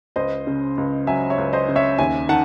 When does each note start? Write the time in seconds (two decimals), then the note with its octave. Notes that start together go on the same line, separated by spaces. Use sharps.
0.16 C#2 C5 D#5
0.47 C#3
0.78 C#2
1.07 F#3 E5 G#5
1.30 C#5 E5
1.38 C#2
1.53 C5 D#5
1.68 C#3
1.76 C#5 E5
1.99 D#2 E5 G#5
2.29 D#3 F#5 A5